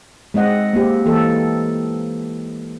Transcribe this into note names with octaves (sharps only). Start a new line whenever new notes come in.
G#3 C4 D#5 F#5
A#3 C4 G4
E3 A#3 A4